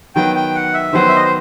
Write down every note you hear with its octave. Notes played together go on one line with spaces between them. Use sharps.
D#3 F#3 B3 G5
G5
F#5
E5
D#3 F#3 B3 C5
E5
D#5
C5